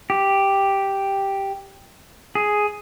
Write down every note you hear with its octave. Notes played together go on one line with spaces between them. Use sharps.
G4
G#4